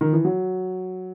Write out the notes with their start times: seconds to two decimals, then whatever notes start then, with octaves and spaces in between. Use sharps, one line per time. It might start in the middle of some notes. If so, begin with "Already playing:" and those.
0.01 D#3
0.13 E3
0.25 F#3